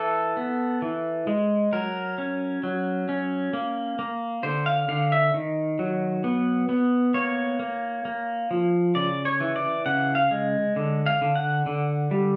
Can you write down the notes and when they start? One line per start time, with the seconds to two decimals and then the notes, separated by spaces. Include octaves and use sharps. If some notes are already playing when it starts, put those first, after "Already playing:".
Already playing: E3 A4
0.37 B3
0.82 E3
1.27 G#3
1.73 F#3 A#4
2.18 C#4
2.63 F#3
3.09 C#4
3.53 A#3
3.99 A#3
4.43 D3 C5
4.66 F5
4.88 D3 F5
5.12 E5
5.34 D#3
5.79 F#3
6.24 B3
6.69 B3
7.14 A#3 C#5
7.59 A#3
8.05 A#3
8.51 F3
8.95 C#3 D5
9.25 C#5
9.40 E3
9.56 D5
9.86 C#3 F#5
10.15 F5
10.31 G#3
10.76 D3
11.06 F5
11.22 D3
11.36 F#5
11.66 D3
12.11 G3